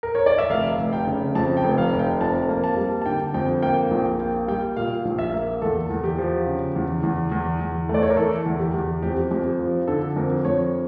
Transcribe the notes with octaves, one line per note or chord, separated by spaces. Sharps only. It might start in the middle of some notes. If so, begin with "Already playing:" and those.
A#4
C#5
D5
E5
F1 F5
F1
G5
C#3
F2 A5
G5
F1
F5
F1
G5
F2 A5
A#3
A5
G3
A5
D3 G5
F2 G5
A#3 G5
A#1 G5
A#3 G5
G3 G5
A#2 F5
A#1
E5
A#3
E2 A4
E2
G4
F3
C#3
E2
E2
E2
E2
A3
D5
C#5
A#4
E3 A4
E2
G4
E2
F2 G4
F2 G4
F3
D3 A4
F2 A#4
F2 C#5